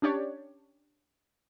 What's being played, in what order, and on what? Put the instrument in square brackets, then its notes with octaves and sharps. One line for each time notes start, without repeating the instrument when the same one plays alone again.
[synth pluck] C#4 D4 G4 C#5 D5